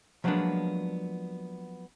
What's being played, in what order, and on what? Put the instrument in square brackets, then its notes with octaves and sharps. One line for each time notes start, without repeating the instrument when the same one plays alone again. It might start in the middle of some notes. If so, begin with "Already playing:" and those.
[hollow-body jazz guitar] F3 F#3 G#3 A#3 B3 D4